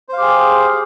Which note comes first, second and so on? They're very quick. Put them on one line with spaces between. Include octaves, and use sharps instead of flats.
C5 F5 G4 G#4